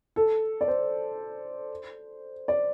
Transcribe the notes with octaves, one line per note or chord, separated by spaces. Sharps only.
A4
D5
C5
D5